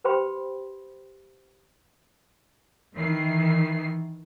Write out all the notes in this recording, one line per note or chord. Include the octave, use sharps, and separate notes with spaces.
G4 B4 C5 G5 B5 C6
D#3 E3 C7